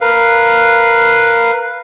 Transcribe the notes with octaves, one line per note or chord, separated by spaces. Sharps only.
A#4 B4 F5